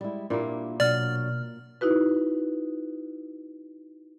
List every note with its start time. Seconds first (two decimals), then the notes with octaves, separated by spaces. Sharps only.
0.01 G3 G#3 E4
0.30 A#2 A#3 D4 E4 G4
0.80 B2 F#3 D4 F#4 D5 F6
1.81 D#4 E4 F#4 B4